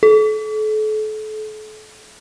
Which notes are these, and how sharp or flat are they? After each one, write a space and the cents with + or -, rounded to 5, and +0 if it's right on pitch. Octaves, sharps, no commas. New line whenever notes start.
A4 -35